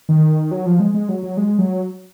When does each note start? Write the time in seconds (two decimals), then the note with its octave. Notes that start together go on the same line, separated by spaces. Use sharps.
0.09 D#3
0.51 F#3
0.66 F3
0.80 G#3
0.94 G#3
1.09 F#3
1.23 F#3
1.37 G#3
1.59 F#3